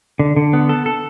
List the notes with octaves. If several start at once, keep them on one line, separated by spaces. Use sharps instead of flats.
D3
D3
B3
A4
A4